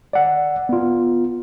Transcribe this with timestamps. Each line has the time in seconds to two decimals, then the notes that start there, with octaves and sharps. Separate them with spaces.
0.13 D5 F#5
0.69 B3 F4